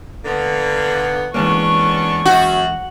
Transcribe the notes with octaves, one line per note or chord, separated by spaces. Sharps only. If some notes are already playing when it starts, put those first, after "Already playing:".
D3 A#3 B3
E3 G#3 A#3 B3 C#4 D4 C#6
F#2 F#4